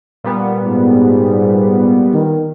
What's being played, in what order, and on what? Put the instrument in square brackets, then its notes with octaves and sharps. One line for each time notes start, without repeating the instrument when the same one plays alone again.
[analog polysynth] A#2 G3 B3
[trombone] G#2
D#3